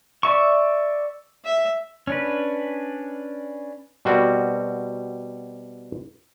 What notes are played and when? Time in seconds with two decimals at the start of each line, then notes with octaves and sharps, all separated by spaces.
0.23 D5 E5 C#6
1.45 E5
2.07 C#4 D4 B4
4.05 B2 G3 C4 F#4 A#4